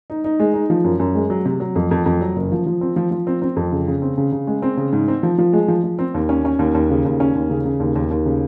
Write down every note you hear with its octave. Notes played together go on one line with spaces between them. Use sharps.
D#4
D#4
G#3
D#4
F3
F#2
F#2
G#3
F#3
C3
F#3
F2
F2
F2
F#3
F#1
F3
F3
C4
F3
F3
C4
C4
F2
C#3
C#3
C4
C#3
C#3
G#3
C4
C#3
G#2
C4
F3
F3
G#3
F3
F3
C4
D#2
C#4
C#4
D#2
D#2
C#3
D#2
C#4
D#2
C#3
C#3
D#2
D#2
D#2
C#3